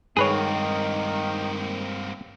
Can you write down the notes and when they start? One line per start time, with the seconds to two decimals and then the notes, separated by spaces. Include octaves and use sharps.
0.17 G2 D#3 G#3 A#3 C4 G#4 B4 C#5